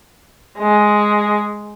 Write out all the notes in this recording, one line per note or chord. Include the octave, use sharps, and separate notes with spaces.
G#3